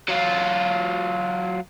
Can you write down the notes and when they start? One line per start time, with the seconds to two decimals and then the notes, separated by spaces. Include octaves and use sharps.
0.08 F#3 F4